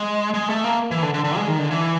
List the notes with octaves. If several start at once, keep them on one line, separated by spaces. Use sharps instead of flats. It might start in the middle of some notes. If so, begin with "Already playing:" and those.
Already playing: G#3
G#3
A3
A#3
E3
D3
D3
D3
G#3
D#3
D3
E3